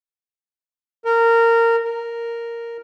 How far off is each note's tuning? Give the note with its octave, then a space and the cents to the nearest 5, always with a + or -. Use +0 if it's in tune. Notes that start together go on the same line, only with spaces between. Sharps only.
A#4 -20
A#4 -5